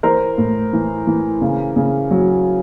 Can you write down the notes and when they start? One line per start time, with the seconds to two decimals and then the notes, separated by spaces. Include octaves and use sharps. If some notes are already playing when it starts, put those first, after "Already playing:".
0.03 E3 A#4 C5
0.38 A2
0.73 E3
1.07 E3
1.41 C#3
1.76 C#3
2.11 F#3